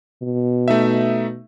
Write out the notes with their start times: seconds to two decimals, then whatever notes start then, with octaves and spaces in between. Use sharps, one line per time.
0.23 B2
0.68 A3 D#4 E5